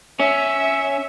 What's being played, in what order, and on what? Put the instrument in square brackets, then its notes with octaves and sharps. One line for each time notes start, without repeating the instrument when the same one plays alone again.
[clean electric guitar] C#4 [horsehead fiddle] E5